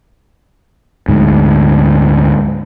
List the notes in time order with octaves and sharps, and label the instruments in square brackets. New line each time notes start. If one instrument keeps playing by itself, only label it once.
[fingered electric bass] D2 G#2